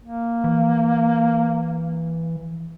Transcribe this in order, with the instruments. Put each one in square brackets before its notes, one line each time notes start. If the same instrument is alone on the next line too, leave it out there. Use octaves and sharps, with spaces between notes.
[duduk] A#3
[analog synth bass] E3